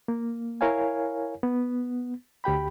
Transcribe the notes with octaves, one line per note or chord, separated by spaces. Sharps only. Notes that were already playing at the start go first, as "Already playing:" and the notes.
A#3
E4 A#4 C#5 F5 G#5
B3
D2 G4 G5 B5